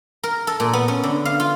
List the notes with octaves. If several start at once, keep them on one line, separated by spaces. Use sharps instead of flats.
A#4
A4
A#2
B3
C#4
D3
F5
F4